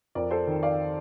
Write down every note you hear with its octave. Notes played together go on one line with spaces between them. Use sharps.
F2 A#4 D5
A4 C5
D#3
D5 F5